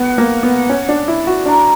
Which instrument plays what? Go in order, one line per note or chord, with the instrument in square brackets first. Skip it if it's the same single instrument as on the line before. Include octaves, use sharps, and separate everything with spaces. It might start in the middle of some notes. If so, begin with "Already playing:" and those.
Already playing: [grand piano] B3 [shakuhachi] F#5
[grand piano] A#3
B3
C#4
D4
E4
F#4
[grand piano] D4 [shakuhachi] A#5